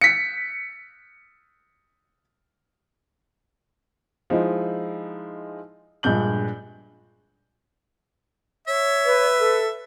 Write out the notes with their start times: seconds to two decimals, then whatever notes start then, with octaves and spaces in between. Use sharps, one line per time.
0.01 B6 C#7
4.30 F3 G#3 D#4 E4
6.03 A#1 G2 G#3 G6 F#7
8.68 C#5 E5
9.06 B4
9.40 A4